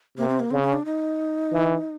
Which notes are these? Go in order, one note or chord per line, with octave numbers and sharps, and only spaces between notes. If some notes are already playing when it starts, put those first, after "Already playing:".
C3 A#3
C4
A#3
C#3 C4
C#4
D4
D#4
E3